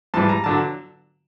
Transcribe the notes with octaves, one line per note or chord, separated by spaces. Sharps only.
G#2 E3 G3 A5
A#5
D3 F#3 A5